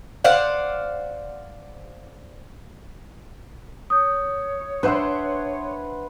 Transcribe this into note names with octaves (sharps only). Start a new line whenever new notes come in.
C5 D5 F5 F#5
C#5 D#6 G6
D4 B4 C5 E5 F#5 C6